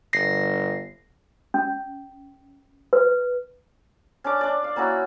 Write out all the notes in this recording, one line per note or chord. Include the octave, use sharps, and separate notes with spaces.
G1 A#6 C7
C#4
B4
C#4 D4 D6
D4 D5
F5
A#3 C#4 E4 F#4